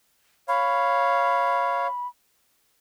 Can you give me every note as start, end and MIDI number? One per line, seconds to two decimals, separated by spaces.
0.48 1.87 73
0.48 1.87 77
0.48 2.07 83